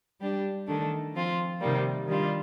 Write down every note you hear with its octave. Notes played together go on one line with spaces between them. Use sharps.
G3 D4 G4
D#3 A3 D4
F3 C4 F4
C3 D#3 G3 A#3
D#3 G3 D4 F4